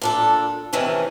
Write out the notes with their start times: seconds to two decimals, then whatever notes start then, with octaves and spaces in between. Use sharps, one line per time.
0.01 A#2 D4 A4
0.73 C3 D#3 E3 A3 C#4